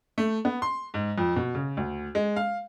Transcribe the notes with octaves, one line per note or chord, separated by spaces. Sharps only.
A3
B3
C6
G#2
F2
B2
C#3
D2
G#3
F5